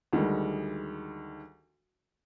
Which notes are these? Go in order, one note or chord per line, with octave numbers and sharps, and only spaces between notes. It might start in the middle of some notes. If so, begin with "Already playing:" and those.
D2 D#3 G3 G#3